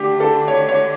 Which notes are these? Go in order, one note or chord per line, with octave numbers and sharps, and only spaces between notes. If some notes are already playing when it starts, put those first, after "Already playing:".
Already playing: D3 A3 D4 G4
A4
C#5
C#5